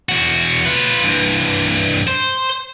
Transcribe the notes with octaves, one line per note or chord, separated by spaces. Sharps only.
E2 F#4
F4 B4
G2 E3
C5